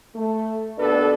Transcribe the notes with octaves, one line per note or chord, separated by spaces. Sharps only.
A3
D#2 B2 D4 A4 B4 D5